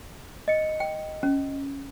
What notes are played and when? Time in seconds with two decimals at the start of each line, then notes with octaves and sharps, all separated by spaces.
0.48 D#5 C#7
0.80 G5
1.23 C#4